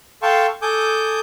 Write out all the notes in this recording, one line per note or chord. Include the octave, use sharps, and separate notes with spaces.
A4 F5 G5 A5 C6 C#6
A4 G#5 D6 D#6 G6